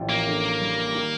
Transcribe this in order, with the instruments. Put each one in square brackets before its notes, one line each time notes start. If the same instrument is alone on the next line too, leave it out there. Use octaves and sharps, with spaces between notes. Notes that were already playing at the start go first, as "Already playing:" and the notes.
Already playing: [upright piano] A1 F3
[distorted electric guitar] A#3
[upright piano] D3
G3
D#3